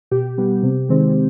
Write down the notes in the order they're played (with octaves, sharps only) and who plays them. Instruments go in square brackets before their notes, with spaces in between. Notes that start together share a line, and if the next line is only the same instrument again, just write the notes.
[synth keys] B2 G4
G3 B3
C3
D#3 G#3 C4